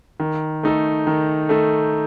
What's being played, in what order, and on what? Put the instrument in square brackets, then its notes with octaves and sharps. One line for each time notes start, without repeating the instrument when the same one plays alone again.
[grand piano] D#3
A3 D#4 A4
D#3
A3 D#4 A4